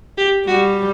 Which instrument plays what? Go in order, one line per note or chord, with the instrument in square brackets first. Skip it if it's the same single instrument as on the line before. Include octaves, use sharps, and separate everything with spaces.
[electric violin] G4
[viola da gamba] G3 [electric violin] F#4